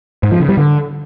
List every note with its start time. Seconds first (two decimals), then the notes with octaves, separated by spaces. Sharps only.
0.23 G#2
0.32 F3
0.40 C#3
0.49 G3
0.57 D3